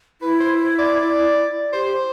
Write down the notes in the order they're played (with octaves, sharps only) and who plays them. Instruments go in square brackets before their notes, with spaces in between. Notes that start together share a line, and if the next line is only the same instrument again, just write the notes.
[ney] E4 [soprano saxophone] B4
[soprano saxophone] C5
D5
[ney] G4 [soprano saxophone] C5